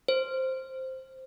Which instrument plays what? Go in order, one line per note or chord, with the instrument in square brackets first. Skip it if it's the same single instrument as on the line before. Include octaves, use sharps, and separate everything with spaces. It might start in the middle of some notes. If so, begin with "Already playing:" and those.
[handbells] C5